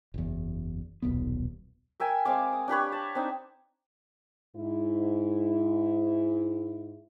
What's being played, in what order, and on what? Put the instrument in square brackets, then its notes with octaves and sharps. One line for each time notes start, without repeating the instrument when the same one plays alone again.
[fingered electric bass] F#1 E2
D#1 B1 B3
[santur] A#4 E5 G5 G#5
G#3 C4 F5 D6
D#6
D4 G4 B4 C#5
A5
C4 D4 D#4
[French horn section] G#2 E4